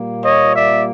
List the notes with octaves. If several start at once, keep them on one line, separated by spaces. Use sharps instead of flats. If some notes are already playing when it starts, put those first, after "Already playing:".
Already playing: A#2 G3 A#3
C#5 D#5
D5 E5